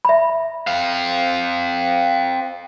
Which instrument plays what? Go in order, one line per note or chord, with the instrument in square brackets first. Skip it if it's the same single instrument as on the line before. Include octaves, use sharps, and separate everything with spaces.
[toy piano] E5 B5
[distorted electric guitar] C4 F5